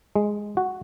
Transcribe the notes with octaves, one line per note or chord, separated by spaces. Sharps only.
G#3
F#4